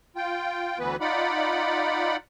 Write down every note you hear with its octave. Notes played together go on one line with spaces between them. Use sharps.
F4 G5
D2 E3 B3 B4
D#4 F4 D5 F#5 B5